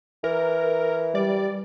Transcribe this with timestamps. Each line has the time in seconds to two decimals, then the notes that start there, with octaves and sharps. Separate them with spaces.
0.24 E3 A#4
1.15 G3 D5